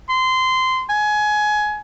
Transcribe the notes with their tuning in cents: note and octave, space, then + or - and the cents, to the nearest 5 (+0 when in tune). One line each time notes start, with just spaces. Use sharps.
C6 -20
G#5 +20